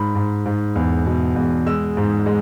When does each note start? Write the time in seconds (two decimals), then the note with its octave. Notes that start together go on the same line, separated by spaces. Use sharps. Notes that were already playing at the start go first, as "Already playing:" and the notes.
Already playing: G#2 B5
0.15 G#2
0.46 G#2
0.76 E2
1.06 B2
1.36 E2
1.66 G#3 E6
1.97 G#2
2.26 G#3